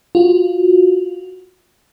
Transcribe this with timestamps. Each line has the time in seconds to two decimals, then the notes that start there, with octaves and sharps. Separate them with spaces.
0.15 F4 F#4